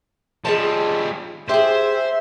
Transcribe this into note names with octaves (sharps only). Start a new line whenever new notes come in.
G3 F4 G#4 D#5 A5
G4 G#4 C5 E5